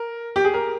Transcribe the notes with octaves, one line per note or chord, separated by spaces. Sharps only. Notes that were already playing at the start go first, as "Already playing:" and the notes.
Already playing: A#4
G4
G#4
A#4